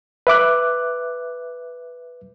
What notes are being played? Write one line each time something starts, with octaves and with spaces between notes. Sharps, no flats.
B4 E5 D6 F#6